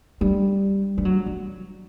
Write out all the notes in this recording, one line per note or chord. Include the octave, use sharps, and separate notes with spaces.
G3
G3
F#3
F#3